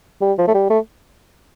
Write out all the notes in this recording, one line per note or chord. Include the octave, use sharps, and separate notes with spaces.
G3
F3
A3
G3
A3